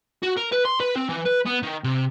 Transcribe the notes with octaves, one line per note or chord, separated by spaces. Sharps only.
F#4
A#4
B4
C6
B4
C4
E3
B4
B3
D#3
C3